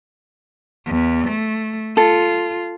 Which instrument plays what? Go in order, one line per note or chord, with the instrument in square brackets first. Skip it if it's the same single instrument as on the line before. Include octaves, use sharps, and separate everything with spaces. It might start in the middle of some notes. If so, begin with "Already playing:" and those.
[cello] E2
A3
[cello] F4 [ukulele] A4